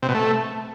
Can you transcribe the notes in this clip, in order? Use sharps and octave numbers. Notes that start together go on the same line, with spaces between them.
C3
B2
A3